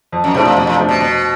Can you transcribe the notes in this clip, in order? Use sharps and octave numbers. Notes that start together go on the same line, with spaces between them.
F2
F#2
A2 C3 F3 A3 D4
A#2
F2 B2
A#2
C3 F3 A3 D4
B2
F2 B2